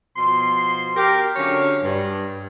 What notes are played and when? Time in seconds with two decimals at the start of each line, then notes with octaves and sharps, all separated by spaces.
0.16 B2 F3 C6
0.96 G4 A#4
1.36 D3 F#3 C#4 C#5 F5
1.83 G2